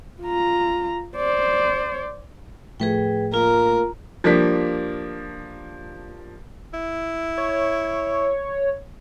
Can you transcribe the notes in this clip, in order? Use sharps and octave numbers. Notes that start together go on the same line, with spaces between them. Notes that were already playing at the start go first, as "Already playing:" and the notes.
F4 A#5
C5 D5
A2 F3 A3 G#4 B4 G5
A#3 F4 A#4
F3 G3 A#3 D4 B6
E4
C#5